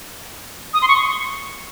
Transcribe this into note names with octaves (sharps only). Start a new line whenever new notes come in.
D#6
C6
C#6